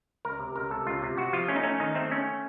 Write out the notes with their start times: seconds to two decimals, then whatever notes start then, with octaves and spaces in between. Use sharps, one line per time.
0.25 C#2 A#4
0.40 C3
0.55 C#2 A#4
0.71 C3 A4
0.86 C#2 F4
1.02 C3
1.18 C3 F#4
1.33 F3 F4
1.48 A3 C#4
1.56 D#4
1.64 A3 C#4
1.80 D#3 D#4
1.95 A3 C4
2.11 A3 C#4